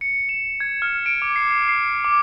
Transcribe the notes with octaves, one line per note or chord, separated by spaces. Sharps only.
C#7
E7
G#6
F6
D7
D6
C7
C7
C7
D6